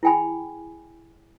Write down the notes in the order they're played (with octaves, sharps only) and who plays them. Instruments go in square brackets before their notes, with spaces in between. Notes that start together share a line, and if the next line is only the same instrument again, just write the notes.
[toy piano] E4 G#4 G5 G#5 B5